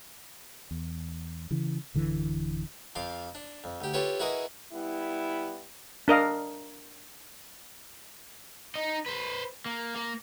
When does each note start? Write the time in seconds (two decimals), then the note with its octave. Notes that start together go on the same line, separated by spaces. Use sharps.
0.71 E2
1.51 C#3 E3
1.94 D1 D3 E3
2.95 F2 F3 F5 C6 D6
3.35 D4
3.64 F2
3.81 D2 G4
3.94 F4 G4 A4 B4 C#5
4.20 E4 F#4 G#4 A#4 B4 D#5
4.72 G3 B3 E4
6.08 D4 A#4 D#5 F5
8.76 D#4 D#5
9.06 B4 C5
9.66 A#3
9.96 A#3